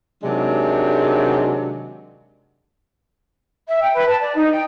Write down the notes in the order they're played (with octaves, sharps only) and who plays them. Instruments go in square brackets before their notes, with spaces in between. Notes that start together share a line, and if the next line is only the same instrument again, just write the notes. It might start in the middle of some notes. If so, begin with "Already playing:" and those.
[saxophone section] C3 D#3 F#3 G#3 D4
[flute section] E5
G5
B4
A5
D5
D#4
G5